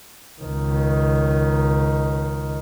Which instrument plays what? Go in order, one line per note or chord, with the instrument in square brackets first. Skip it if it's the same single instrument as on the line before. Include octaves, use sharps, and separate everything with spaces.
[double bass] C#2 D#3